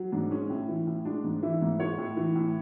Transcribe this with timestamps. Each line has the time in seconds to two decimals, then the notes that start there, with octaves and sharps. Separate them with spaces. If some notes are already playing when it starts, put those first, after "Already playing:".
Already playing: F#3
0.12 G#2 D4
0.31 G#3 C#4
0.50 A2
0.68 E3
0.87 A2
1.05 G#3 D4
1.24 G#2
1.43 E3 E4
1.62 G#2
1.80 G#3 C#5
1.98 A2
2.17 E3
2.35 A2